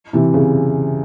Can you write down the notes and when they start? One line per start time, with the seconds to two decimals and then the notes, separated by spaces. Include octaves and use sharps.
0.13 C3 E3
0.34 C#3